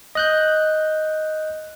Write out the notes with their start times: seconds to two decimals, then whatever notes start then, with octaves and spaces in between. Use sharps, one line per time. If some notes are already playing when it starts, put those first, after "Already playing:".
0.15 D#5 F#6 G6